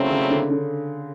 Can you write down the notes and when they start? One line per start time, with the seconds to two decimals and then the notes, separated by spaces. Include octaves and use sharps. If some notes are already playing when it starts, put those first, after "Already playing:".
Already playing: A#2 C#3 F#3 A3 C4 E4
0.11 C#3
0.30 D3
0.50 D3